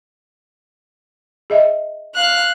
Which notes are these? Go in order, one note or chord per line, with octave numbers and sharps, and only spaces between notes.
G#4 D#5 E5
F5 F#6